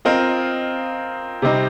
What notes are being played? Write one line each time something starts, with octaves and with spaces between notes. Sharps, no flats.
C4 F4 A#4 D#5
C3 G3 C4 D#4